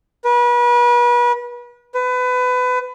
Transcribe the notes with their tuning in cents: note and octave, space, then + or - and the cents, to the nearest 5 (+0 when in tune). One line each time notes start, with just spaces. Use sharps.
B4 -35
B4 +25